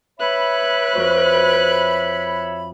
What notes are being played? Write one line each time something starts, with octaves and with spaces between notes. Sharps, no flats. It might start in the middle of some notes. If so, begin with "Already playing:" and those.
B4 C#5 E5 B5 F#6
F2 F#4 C5